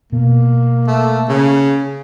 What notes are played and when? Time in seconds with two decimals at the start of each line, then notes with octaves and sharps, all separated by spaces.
0.12 B2 A#3
0.87 A3
1.28 C#3